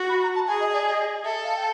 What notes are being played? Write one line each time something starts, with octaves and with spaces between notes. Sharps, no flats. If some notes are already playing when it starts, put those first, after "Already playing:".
Already playing: F#4
B5
A#5
A5
G#4 G#5
D#5
D5
D#5
A4 E5
F5
G5